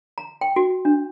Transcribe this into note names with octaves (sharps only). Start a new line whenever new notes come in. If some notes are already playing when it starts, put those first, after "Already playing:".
A#5
G5
F#4
D4